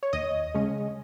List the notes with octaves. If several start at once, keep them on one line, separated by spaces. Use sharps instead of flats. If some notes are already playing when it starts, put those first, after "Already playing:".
C#5
D#2 D#5
C#3 G#3 C#4